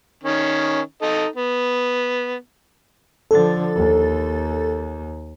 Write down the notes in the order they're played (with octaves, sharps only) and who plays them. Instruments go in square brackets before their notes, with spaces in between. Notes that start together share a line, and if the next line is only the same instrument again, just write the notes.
[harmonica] D#3 C#4
D#4 A4 D#5
B3
[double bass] D3 F3 [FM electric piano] A4 A6
[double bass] D#2